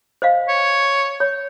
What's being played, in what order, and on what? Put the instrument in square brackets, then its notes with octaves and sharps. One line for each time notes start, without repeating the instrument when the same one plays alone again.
[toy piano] C5 D#5 F5
[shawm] C#5
[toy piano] C#5